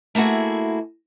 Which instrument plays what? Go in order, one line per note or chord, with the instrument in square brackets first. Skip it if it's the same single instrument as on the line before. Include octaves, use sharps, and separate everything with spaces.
[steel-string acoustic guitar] A3 A#3 E4 F#4 G#4